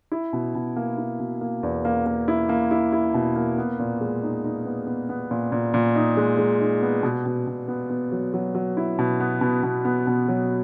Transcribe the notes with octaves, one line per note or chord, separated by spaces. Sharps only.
E4
B2
B2
A#3
E4
B2
A#3
E2
A#3
A#3
E4
A#3
E4
E4
B2
A#3
B3
A#2
G#3
D#4
D#4
B3
B3
B3
A#2
A#2
A#2
D#4
G#3
G#3
D#4
B3
B2
B2
B2
B3
B3
F#3
F#3
F#3
E4
B2
B3
B2
B2
B3
B2
F#3